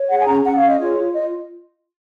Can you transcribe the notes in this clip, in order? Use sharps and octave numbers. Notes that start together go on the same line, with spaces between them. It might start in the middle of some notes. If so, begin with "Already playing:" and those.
Already playing: C#5
G#4 F#5
G#5
C#4 A#5
C#4 F#5
F5
G#4
D#5
F4 C#5
F4
F4 D#5